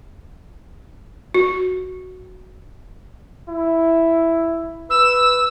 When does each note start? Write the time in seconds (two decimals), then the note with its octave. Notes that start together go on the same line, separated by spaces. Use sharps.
1.34 F#4
3.49 E4
4.90 B4 E6